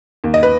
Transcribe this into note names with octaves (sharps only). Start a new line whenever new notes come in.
D#2
D#5
B4